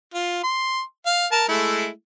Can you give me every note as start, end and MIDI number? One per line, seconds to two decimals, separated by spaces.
0.14 0.43 65
0.43 0.82 84
1.06 1.27 77
1.32 1.45 70
1.32 1.45 81
1.48 1.89 56
1.48 1.89 57
1.48 1.89 64